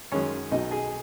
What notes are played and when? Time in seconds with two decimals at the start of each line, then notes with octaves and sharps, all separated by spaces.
0.12 F#2 D#3 G#3 C#4 C#5
0.51 B1 B2 F#3 D#4 D#5
0.71 G#4 G#5